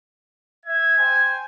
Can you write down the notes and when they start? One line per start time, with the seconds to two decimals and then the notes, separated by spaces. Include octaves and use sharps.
0.66 E5 G#6
0.98 C5 G5 G#5